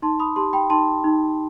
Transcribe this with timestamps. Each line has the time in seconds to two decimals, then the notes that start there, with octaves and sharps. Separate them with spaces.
0.02 D#4 A5 C6
0.20 B5 D#6
0.36 G4 A5 C6
0.53 G5 B5
0.70 D#4 A5 C6
1.04 D#4